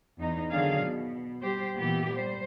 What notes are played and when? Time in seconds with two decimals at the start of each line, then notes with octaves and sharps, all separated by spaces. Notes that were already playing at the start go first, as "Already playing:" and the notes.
0.20 E2 D#4
0.50 D3 D#3 F#3 D4 G#4 F5
0.81 B2
1.42 G3 G4 C5
1.78 A#2 E3 B3 G4
2.13 G3 C5